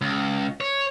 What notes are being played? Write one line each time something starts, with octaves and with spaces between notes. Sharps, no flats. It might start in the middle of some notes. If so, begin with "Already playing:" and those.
C#2
C#5